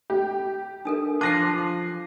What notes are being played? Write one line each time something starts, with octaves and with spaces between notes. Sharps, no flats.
G4
D4 A4 A#4
F3 D4 F4 A5 D6 F#6 A#6 C7